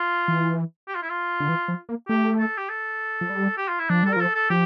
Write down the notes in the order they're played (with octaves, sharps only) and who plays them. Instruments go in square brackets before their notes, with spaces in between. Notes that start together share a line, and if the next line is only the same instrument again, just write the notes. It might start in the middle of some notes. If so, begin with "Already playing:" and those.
Already playing: [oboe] F4
[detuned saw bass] E3
[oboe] G4
F4
E4
F4
[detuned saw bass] D3
E3
F3
A#3
[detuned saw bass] A3 [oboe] G4
[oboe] A4
G4
A4
[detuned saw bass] F3
G3
[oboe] G4
F4
E4
[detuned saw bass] F3 [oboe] D4
[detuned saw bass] G3 [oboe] A4
[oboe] A#4
[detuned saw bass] F3 [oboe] A4
[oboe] A4
[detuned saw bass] F3 [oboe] G4